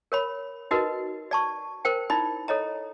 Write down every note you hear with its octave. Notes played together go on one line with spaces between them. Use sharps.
A#4 C#5 B5
D#4 F#4 A#4 B4 D#5
D5 A5 C#6
A#4 C5 G5
D#4 E4 D5 B5
A4 C#5 D#5 A#5